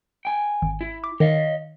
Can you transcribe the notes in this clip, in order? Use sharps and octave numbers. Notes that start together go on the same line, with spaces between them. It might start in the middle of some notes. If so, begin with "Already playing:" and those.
G5 G#5
G#1
E4
D6
D#3 C#5 D#5 F5